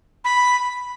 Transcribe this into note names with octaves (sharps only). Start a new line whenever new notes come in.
B5